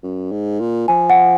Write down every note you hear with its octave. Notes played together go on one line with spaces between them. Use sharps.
F#2
G#2
A#2
F3 G#5
F#5